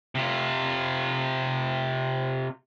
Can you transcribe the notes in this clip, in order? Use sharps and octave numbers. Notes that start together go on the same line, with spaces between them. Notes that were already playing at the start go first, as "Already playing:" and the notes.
C3 F4